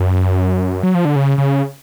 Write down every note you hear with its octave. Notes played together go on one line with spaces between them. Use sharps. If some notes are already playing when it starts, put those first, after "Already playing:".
Already playing: F#2
F#3
F3
D3
C#3
C#3